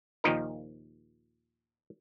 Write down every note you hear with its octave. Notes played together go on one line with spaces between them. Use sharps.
D#2 A#2 D#3 F3 D#4 A#4